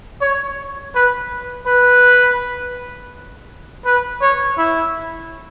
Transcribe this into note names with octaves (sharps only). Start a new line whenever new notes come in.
C#5
B4
B4
B4
C#5
E4